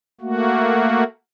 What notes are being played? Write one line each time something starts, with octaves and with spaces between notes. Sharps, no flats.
A3 A#3 F#4